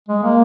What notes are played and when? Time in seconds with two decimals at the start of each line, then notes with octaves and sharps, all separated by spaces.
0.09 G#3
0.24 A#3